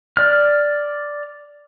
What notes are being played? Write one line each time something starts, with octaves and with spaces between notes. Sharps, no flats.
D5 F6